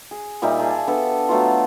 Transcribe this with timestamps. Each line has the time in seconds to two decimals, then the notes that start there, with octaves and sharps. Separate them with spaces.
0.11 G#4
0.42 A#2 G3 D#4 E5
0.59 G#4 D5 E5 A5
0.87 B3 D4 G4 A4
1.29 F#3 A3 B3 F4